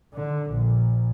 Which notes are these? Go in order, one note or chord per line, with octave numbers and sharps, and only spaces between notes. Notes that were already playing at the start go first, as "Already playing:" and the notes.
D3
A#1